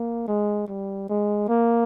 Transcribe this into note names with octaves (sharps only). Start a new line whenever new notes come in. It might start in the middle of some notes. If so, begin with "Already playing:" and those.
Already playing: A#3
G#3
G3
G#3
A#3